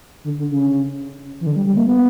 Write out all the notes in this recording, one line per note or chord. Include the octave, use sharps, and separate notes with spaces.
D3
D3
C#3
E3
D3
G3
G3
A#3
B3